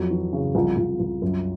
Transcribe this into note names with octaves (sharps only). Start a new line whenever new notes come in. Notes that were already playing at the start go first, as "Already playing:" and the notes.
Already playing: F2 F#3
E3
C#3
C2 F3
C2
C2
F#2